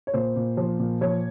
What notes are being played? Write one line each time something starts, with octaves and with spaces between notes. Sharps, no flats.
C#5
A#2 C5
A#2
F3
A#2
F3 C#5